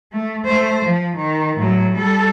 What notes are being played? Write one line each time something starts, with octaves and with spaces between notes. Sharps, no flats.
A3
A3 C5
F3
D#3
A2 F#3
G3 A4